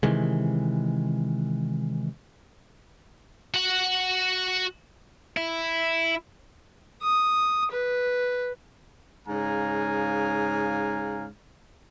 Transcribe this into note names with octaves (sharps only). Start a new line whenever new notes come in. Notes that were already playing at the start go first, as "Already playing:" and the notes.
C3 D#3 E3 G#3
F#4 F#5
E4
D#6
B4
G#2 C#3 F5 G#5 A#5